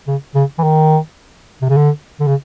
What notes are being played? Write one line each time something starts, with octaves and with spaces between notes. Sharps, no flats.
C#3
C#3
E3
D#3
C3
C#3
D3
D3
C#3